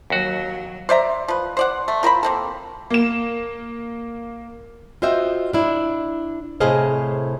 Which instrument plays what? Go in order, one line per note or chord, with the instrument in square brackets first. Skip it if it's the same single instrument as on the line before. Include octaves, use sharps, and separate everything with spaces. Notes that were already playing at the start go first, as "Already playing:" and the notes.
[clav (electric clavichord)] D#2 F#4 [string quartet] F#3
[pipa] C5 D5 E5 A#5
F3 B4
C5 D5 F#5
A3
F3 A#4 C5 B5
A#3 C4 A4
[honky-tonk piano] A#3 E7
[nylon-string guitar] F4 F#4 C5 D#5 E5 G5
D4 E4
A2 C3 G#4 C5 D#5 F5